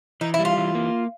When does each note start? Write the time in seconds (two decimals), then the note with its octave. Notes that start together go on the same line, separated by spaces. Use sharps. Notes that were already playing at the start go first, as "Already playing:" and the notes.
0.21 E3 D#4
0.34 E4
0.39 G3
0.45 F4
0.57 E3
0.75 A#3